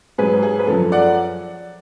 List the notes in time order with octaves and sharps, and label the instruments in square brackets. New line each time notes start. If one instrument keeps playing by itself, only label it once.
[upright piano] G#2 F#3 G#4 B4
G#4
B4
F#2 F3 A4
D5 F#5